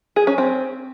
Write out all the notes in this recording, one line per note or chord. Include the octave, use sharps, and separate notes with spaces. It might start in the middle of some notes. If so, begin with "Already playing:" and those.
G#4
C#4
C4